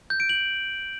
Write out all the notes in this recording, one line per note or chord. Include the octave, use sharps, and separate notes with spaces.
G6
D7
F#7